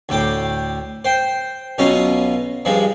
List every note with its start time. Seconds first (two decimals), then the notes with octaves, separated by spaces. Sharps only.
0.09 D2 A2 G5 D6
1.05 C5 G5
1.78 B1 B2 C#4 F4 A#5
2.65 G2 F3 G#3